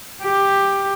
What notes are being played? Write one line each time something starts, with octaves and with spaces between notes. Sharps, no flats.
G4